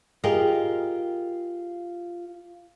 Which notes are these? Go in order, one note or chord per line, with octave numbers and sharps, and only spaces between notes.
F4 G4 G#4 A#4 D#5